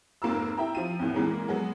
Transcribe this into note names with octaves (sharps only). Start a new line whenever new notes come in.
F1 G#2 A#3 F4 A#5 E6
E4 E5 G5 A#5
F3 F4 D#7
E2 A2
A#2 E3 G#3 A#3
F#3 G#3 B3